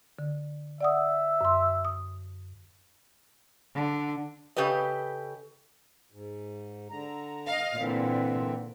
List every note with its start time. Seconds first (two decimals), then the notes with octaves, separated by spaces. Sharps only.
0.19 D3
0.81 D5 E5 F#5 D#6
1.41 F#2 C6
1.85 D#6
3.74 D3
4.56 C#3 G4 A4 B4 D#5
6.12 G#2
6.90 D3 A#5
7.48 D#5 F5
7.79 A#2 D3 E3 C4